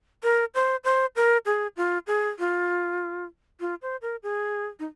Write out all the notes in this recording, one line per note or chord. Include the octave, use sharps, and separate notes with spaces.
A#4
C5
C5
A#4
G#4
F4
G#4
F4
F4
C5
A#4
G#4
D#4